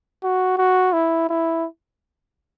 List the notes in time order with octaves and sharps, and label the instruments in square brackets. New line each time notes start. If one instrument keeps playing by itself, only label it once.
[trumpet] F#4
F#4
E4
E4